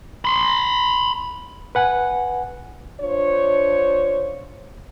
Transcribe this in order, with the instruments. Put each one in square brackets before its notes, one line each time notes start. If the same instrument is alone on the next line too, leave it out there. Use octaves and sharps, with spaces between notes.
[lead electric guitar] B5 C6
[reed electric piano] B4 F#5 G#5
[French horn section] D4 F4 C5 C#5